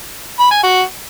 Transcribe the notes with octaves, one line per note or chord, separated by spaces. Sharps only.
B5
G#5
F#4